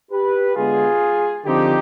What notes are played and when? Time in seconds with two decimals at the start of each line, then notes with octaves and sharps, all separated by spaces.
0.12 G4 B4
0.55 D3 G#3 B3 F4 G#4
1.45 D3 F3 C4 D#4 G4